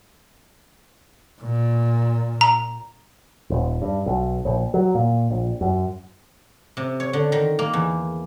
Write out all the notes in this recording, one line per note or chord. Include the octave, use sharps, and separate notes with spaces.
A#2
A#5
D#1
G2
B1
A#1
F#3
A#2
A#1
F#2
C3
C#5
D3
D#3
A#3
E2